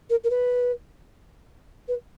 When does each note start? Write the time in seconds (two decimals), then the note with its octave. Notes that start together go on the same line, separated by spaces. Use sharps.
0.10 A#4
0.24 A#4
0.30 B4
1.88 B4